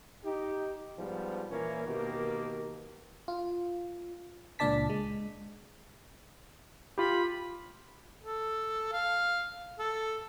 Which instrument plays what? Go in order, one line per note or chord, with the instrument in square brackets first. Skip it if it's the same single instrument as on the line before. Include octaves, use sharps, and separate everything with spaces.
[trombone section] D#4 G4
G#2 F3 G3 B3
A#2 E3 A#3 C#4
B2 D#3 A#3 G4
[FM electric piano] F4
C#2 A#2 D4 D5 A5 B6
G#3
[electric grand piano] F4 G4 [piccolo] B5
[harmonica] A4
F5
A4